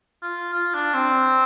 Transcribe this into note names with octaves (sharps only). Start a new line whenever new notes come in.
F4
F4
D4
C4